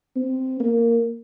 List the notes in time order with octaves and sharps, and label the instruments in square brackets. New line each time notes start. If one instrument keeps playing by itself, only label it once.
[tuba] C4
A#3